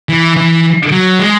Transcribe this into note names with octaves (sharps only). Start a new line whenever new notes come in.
E3
E3
F#3
G#3